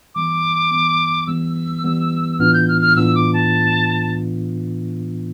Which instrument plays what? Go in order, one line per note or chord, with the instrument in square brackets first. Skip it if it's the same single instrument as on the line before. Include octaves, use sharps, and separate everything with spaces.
[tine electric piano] E3 G3 B3 [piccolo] D6
[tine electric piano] E3 G3 B3
[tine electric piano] E3 G3 B3 [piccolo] E6
[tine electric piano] E3 G3 B3
[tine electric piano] A2 E3 B3 D4 F4 [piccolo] F6
[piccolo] G6
F6
F6
[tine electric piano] A2 E3 B3 D4 F4 [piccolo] E6
[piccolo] D6
A5